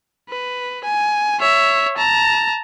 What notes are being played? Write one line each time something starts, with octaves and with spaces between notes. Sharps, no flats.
B4
G#5
C#5 E5
A5 A#5